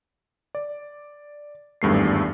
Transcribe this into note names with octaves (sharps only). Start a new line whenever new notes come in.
D5
G#1 E2 G2 A3 C7